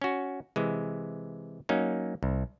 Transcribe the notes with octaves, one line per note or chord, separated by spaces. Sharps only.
C#4 F#4
C3 E3 G#3
F#3 A#3 C#4 D#4
C2